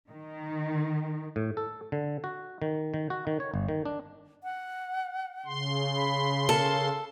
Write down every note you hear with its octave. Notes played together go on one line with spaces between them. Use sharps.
D#3
A2
A4
D3
F#4
D#3
D#3
F#4
D#3
C#5
G1
D#3
D4
F#5
C#3 C6
B5
A4 A#4